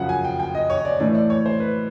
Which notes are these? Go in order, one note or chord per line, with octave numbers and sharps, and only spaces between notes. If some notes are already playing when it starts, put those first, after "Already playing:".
Already playing: F#2 C#3 F3 F#5
G#5
G5
G5
D#5
C#5
D5
A2 E3 A3 D5
D5
C#5
C5
B4